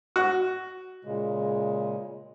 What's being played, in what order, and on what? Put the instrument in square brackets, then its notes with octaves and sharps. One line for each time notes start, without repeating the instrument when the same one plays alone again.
[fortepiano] F#4
[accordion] A#2 C#3 G#3